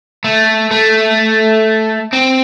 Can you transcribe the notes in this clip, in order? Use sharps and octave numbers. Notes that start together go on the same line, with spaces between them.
A3
A3
C4